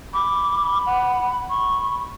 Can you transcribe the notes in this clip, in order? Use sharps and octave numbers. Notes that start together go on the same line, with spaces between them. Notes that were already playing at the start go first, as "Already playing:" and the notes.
B5 D6
F#5
B5 C#6